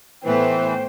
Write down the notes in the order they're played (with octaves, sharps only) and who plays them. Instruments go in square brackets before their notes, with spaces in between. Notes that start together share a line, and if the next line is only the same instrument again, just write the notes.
[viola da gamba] A2 A3 B3 [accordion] E3 [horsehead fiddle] C5 G5